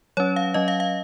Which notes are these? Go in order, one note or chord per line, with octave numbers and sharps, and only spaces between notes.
F#3 C#4 C#5
F5
F#3 C#4 D#5
F5
F5